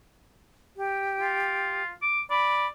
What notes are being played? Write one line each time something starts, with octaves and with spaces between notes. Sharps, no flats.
G4
F4
D6
D5 B5